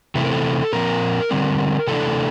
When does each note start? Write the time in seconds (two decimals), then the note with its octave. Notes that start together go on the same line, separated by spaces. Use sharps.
0.15 C3 E3 A3 C4 A4
0.24 A#4
0.31 A4
0.73 A#2 F3 C4 A#4
1.31 D3 G3 C4
1.88 C3 E3 A3 D4 A4